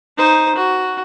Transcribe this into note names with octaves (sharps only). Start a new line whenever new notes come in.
D#4 C5
F#4